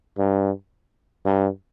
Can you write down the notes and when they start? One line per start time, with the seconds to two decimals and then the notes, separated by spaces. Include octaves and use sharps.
0.18 G2
1.26 G2